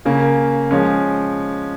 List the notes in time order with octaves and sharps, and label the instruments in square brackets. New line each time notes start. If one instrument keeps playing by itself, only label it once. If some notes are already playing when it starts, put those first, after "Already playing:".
[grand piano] C#3 A#3 C#4
F3 G#3 C#4